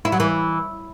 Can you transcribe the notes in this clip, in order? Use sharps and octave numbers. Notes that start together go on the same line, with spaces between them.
E4
F#3
E3